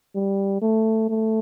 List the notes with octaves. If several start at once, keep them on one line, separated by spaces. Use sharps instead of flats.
G3
A3
A3